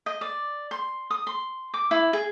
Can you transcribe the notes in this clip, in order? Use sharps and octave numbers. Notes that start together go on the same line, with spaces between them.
D#5
D5
C6
D#6
C6
D6
E4
G#4